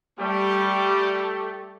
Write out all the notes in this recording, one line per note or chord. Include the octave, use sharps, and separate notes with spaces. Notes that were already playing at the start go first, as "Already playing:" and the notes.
G3 A3 G4